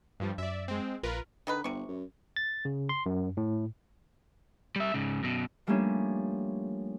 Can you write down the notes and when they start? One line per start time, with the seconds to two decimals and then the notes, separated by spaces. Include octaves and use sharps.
0.20 G2 F3 G3
0.38 F#2 D5 E5
0.68 G#3 C4
1.03 A#1 F4 A#4 B4
1.47 D3 D#3 D#4 B4
1.64 G1 C3 C#6
1.88 F#2
2.36 A6
2.65 C#3
2.89 C6
3.06 F#2
3.37 A2
4.76 G3 E5
4.94 G#2 C#3
5.23 F#2 B2
5.67 F3 G3 A3 A#3 C#4 D4